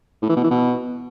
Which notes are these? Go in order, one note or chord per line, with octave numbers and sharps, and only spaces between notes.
A2
E3
B2
E3
B2